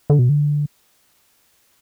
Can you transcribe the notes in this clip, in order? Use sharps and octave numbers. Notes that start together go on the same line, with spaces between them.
D3
B2
D3